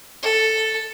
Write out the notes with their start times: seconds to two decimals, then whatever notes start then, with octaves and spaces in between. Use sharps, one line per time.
0.23 A4